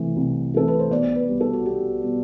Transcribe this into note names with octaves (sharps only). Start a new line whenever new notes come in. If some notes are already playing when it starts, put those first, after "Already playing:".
Already playing: C3 E3 A3
C2
C3 E3 A3 A4
B4
C5
B1 D5
B4
B2 G3
A4
F#4
B1 G4
B2 G3